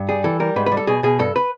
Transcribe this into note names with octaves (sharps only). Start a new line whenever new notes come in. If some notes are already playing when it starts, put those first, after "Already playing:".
Already playing: G2
G3 G#4
E3 A4
G3 A#4
G#2 B4
B4
G3
A4
B2 G#4
B2 G#4
G2 A4
B4